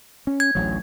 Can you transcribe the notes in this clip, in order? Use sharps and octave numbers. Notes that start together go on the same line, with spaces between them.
C#4
G#6
A1 D2 F#3